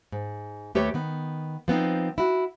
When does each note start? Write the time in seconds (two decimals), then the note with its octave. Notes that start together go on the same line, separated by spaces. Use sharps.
0.12 G#2
0.75 D#2 A3 G4 B4 C#5
0.94 D#3 B3
1.68 F3 B3 C4 D#4
2.18 E4 F#4